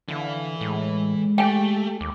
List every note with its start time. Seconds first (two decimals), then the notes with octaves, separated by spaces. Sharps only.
0.09 D3 E3 E4 F5
0.61 A2 G#3
1.38 A3 G4 G5 G#5
2.01 D#2 D6